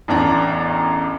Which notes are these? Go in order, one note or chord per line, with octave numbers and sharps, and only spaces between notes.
A1 E2 D4 A#5